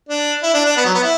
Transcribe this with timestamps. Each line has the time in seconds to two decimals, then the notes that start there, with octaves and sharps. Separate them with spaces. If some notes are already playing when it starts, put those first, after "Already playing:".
0.09 D4
0.43 E4
0.54 D4
0.65 D4
0.77 B3
0.85 F#3
0.94 B3
1.03 E4